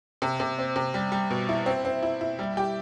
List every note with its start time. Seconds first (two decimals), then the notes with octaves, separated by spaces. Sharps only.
0.22 C3
0.40 C3
0.58 C4
0.76 C3
0.94 G3
1.12 G3
1.30 B2
1.49 E4
1.66 C4
1.85 C4
2.03 E4
2.21 E4
2.39 G3
2.57 G4